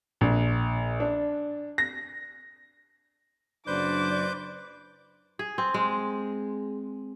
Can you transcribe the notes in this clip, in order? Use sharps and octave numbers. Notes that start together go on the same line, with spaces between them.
A#1
D4
A#6
F#1 F#3 D4 B4 C5 D5 D6 G6
G#4
C4
G#3